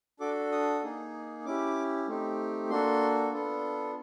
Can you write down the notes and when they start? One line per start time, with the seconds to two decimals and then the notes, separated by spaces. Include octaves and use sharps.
0.20 D4 F#4 A4 D6
0.52 D#6
0.83 A#3 D#4 G#4
1.45 C#4 E4 G4 D6
2.07 A3 C4 D#4 G4
2.70 A#3 D4 F#4 A4 C6
3.32 B3 D4 F4 A4